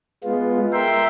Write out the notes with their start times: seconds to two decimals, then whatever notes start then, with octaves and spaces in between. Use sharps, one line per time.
0.24 G#3 B3 F4
0.73 A#4 E5 G5 C6